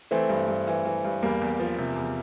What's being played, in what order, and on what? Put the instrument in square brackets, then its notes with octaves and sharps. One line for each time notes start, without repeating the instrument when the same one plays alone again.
[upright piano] E3 A3 C4
G2
G2
E3
E3
G2
E2 G3 A#3
E2
F3
C3
E2